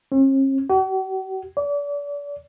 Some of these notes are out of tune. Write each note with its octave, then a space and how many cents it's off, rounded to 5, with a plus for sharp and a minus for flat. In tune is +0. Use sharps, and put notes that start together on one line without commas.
C#4 -45
F#4 +45
D5 -35